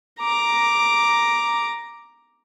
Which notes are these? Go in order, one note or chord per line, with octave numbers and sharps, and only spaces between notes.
A#5 D6